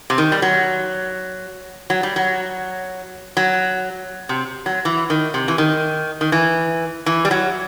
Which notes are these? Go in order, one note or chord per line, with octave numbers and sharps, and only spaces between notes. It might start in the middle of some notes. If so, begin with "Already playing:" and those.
C3
D#3
G3
F#3
F#3
G3
F#3
F#3
C3
F#3
E3
D#3
C3
E3
D#3
D#3
E3
E3
G3
F#3